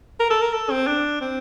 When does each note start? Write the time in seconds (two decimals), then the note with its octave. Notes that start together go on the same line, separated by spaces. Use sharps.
0.20 A#4
0.30 A4
0.42 A#4
0.54 A4
0.70 C4
0.87 D4
1.21 C4